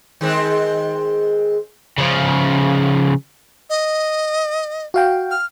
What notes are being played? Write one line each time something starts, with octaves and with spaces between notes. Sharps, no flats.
D#3 G#3 C4
C#3 F3
D#5
F#4 F5 G5
F6